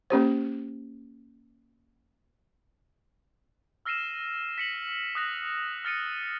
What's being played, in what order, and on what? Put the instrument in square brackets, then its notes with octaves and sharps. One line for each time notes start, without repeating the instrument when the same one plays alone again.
[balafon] A#3 C#4 G4 C5
[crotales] E6 F6 A#6 C7 D#7 E7
B6 C#7 F#7
D#6 F#6 A#6 B6
F6 A6 C#7 D#7